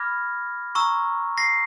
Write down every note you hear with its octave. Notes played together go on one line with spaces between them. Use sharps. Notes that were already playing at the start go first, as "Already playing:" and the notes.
Already playing: B5 D6 F6 G#6 A#6
A#5 C#6 E6
A#6 C7